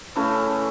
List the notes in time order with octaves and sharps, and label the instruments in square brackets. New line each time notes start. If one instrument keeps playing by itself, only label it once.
[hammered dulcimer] C#3 E3 A3 C#4